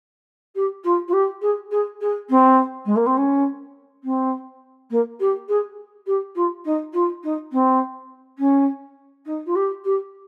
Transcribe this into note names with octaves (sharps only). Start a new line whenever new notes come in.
G4
F4
F4
G4
G#4
G#4
G#4
C4
G#3
A#3
C4
C#4
C4
A#3
G4
G#4
G4
F4
D#4
F4
D#4
C4
C#4
D#4
F4
G4
G4